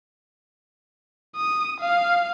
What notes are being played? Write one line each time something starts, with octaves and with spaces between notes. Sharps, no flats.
D#6
F5